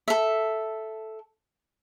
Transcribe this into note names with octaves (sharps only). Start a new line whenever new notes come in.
A4 E5